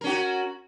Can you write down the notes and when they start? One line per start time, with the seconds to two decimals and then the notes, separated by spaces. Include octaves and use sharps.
0.01 A#4
0.04 C#4
0.07 F#4